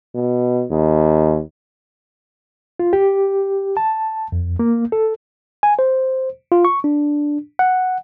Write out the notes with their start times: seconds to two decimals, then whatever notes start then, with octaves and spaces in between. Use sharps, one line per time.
0.15 B2
0.71 D#2
2.80 F4
2.93 G4
3.77 A5
4.32 F2
4.59 A#3
4.92 A4
5.63 G#5
5.79 C5
6.52 F4
6.65 C#6
6.84 D4
7.59 F#5